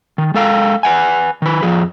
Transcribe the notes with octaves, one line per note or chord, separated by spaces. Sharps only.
D#3
G#3 A4 F5 G5
B4 F#5 G#5
D#3 B4
F2 F3 G#4